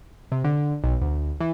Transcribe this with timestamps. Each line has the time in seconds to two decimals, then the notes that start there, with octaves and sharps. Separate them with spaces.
0.32 C3
0.44 D3
0.84 B1
1.01 D2
1.40 E3